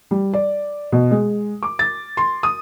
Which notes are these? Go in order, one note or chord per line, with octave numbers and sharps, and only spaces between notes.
G3
D5
B2
G#3
D6
A6
C6
D#6